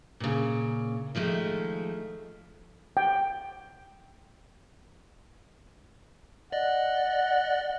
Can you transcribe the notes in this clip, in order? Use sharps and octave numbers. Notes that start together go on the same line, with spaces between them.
A#2 C#3
D#3 F3 G#3 A3
G5
D5 D#5 F#5